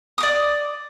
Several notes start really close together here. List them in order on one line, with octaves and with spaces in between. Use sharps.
D#6 D6 D5